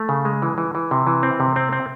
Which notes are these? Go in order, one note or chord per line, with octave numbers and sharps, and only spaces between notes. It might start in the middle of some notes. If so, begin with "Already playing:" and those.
Already playing: A3
C#3
G#3
E3
E3
E3
C3
E3
C4
C3
C4
C4